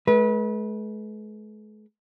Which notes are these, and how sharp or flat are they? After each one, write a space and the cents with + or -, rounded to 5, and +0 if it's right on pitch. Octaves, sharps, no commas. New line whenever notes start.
G#3 +45 B4 -30